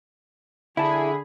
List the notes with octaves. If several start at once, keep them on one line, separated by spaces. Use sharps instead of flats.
D3 E4 G#4 G#5 A5 B5